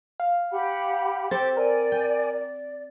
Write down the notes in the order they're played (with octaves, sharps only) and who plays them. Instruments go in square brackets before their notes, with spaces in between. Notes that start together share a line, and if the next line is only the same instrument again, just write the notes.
[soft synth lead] F5
[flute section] G4 F#5 B5
[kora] C4 A4 [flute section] G4 [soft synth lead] A6
[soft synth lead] A#4 [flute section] D5 G#5
[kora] G5
[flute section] D5